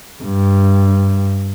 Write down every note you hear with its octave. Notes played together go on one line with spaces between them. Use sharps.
G2